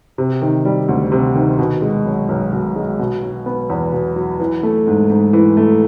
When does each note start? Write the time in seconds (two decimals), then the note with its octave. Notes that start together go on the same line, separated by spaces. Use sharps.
0.18 C3
0.42 D#3
0.65 G3
0.89 D2
1.12 C3
1.35 D#3
1.59 B2
1.82 G#3
2.06 B1
2.29 B1
2.53 B2
2.76 G#3
2.99 B2
3.23 F#3
3.46 B3
3.70 E2
3.93 B2
4.16 F#3
4.40 E3
4.63 A3
4.87 G#2
5.10 G#2
5.33 E3
5.57 A3